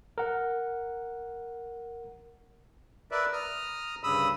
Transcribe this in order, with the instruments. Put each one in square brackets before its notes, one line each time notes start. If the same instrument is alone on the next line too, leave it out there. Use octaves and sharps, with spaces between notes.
[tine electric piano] A#4 F#5
[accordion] A#4 B4 D5 E5
A#5 D#6 F6
D2 G2 C#3 B5 D#6 E6